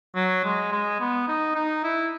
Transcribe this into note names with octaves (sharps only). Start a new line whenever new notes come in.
F#3
G#3
G#3
B3
D#4
D#4
E4